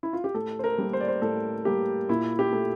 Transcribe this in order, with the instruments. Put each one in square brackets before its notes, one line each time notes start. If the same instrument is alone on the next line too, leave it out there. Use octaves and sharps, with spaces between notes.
[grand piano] E4
F4
G4
A2 A4
C5
A#4
G3 A#3
C5
D5
C5
A2 A4
G3 A#3 G4
A#2 E4
G4
A3